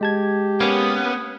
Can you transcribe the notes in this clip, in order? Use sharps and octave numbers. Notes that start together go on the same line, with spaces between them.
G#3 G4 A5 G#6
A#3 B3 C#4